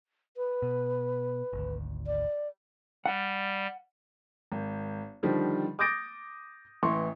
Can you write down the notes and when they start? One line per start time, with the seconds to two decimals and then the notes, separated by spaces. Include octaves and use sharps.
0.37 B4
0.62 B2
1.53 G#1 D2
2.07 D5
3.06 G3 F#5
4.52 G#1
5.23 D3 D#3 F3 G3
5.79 D6 D#6 G6 A6 A#6 D7
6.83 A1 E3 C6 C#6